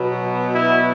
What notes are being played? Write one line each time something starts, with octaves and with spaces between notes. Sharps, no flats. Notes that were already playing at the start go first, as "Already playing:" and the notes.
Already playing: B2 F#3 B3
E4